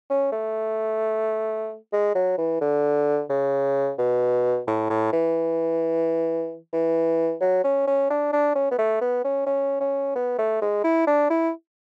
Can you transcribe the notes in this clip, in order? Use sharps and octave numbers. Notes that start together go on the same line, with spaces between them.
C#4
A3
G#3
F#3
E3
D3
C#3
B2
A2
A2
E3
E3
F#3
C#4
C#4
D4
D4
C#4
B3
A3
B3
C#4
C#4
C#4
B3
A3
G#3
E4
D4
E4